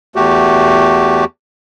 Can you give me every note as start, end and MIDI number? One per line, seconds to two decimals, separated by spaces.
0.16 1.25 40
0.16 1.25 57
0.16 1.25 66
0.16 1.25 67